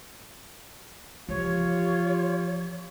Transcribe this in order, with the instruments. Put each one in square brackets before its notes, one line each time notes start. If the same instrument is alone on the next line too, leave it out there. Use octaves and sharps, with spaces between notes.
[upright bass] E3 F3 [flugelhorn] F4 [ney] G4 [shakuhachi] C#5